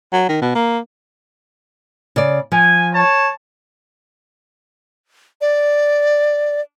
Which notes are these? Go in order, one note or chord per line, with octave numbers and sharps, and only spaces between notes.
F#3
D#3
B2
A#3
C#3 D5
F3 G#5
C#5 A5
D5